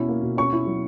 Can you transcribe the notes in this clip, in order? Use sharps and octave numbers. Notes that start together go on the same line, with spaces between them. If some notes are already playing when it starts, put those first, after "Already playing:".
Already playing: B2 C#4 E4
A#3
B2
C#4 C#6
E4
F#3